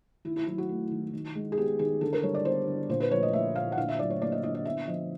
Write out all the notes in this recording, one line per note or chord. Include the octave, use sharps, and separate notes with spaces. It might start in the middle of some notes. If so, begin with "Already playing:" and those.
D#3 E4
E4
F#3 E4
F#4
A3
D#3
D#3
G#3
G#4
B3 G4
D#3 G#4
D3 A4
A#4
G3 C#5
D5
B3 C5
D3
A#2 C5
B4
F3 C#5
D#5
A#3 E5
A#2 F5
F#5
D3 F5
E5
F#3 D5
C#5
A#3 D5
D#5
D3 D#5
D#5
B3 E5
F3 D#5